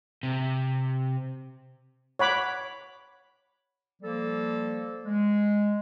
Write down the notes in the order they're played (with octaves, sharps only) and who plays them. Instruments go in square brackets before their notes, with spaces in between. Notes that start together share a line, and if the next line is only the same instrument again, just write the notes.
[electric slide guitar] C3
[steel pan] C#5 F#5 B5 D6
[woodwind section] F3 G3 A#3 A4
G#3